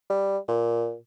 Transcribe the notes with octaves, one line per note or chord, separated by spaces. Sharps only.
G3
A#2